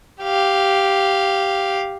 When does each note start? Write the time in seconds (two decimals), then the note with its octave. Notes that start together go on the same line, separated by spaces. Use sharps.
0.22 G4 F5